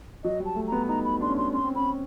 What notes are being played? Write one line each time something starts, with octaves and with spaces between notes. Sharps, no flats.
F#3 D#5
G3
A5
A3
B3 A#5
D#4 A#5
B5
D4 C6
C#4
D4 C6
C#4 C6
C4
C#4 B5